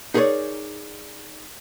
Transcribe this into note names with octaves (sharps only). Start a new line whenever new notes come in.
D#4 G#4 A#4 B4 C#5 D5